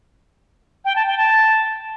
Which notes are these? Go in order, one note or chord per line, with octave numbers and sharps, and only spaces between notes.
G5
A5
G5
A5